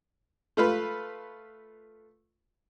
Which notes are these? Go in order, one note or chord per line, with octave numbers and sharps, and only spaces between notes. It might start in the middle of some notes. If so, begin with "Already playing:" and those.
A3 F4 B4